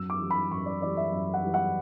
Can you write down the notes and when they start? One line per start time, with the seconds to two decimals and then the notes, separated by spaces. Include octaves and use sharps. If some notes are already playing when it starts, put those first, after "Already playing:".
Already playing: F#2 E6
0.10 D6
0.20 E3 G3
0.30 B5
0.51 F#2 C#6
0.66 D5
0.82 E3 G3 D5
0.97 E5
1.12 F#2 E5
1.34 F#5
1.43 E3 G3
1.54 F#5